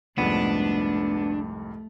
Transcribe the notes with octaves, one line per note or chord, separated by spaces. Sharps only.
C2 F2 G#2 A3 B3 D4